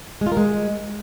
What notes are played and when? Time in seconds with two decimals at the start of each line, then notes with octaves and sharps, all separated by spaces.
0.21 G#3
0.27 F4
0.32 A#4
0.37 G#3